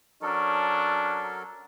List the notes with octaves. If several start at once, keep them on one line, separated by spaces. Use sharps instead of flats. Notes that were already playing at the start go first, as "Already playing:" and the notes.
F#3 C#4 D4 A4 A#4